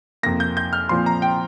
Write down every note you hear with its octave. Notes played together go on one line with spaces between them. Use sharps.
F2 C3 A#3 A#6
G6
G6
F6
A#2 F3 C4 C6
A#5
G5